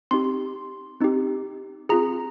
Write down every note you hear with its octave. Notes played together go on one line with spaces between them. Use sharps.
C4 D#4 G4 C6
C4 D#4 G4
C4 F4 G#4 A#5